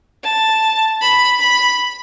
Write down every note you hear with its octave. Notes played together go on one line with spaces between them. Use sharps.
A5
B5
B5